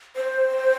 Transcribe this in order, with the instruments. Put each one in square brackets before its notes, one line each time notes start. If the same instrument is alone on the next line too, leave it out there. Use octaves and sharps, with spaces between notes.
[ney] C5